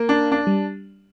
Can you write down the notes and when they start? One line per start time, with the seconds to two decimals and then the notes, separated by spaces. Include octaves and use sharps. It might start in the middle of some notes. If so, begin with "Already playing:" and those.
Already playing: A#3
0.09 D4
0.32 D4
0.47 G3